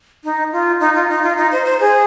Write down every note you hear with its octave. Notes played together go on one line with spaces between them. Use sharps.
D#4
F4
D#4
F4
D#4
F4
D#4
C5
C5
G#4